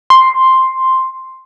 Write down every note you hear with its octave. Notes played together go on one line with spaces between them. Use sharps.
C6